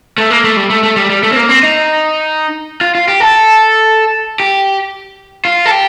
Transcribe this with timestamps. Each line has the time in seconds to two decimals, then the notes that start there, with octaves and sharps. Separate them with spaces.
0.18 A3
0.30 A#3
0.44 A3
0.57 G3
0.70 A3
0.83 A3
0.97 G3
1.10 G3
1.23 A3
1.33 C4
1.36 A#3
1.49 C4
1.63 D#4
2.81 F4
2.95 F4
3.08 G4
3.20 A4
4.40 G4
5.45 F4
5.66 A4
5.71 G4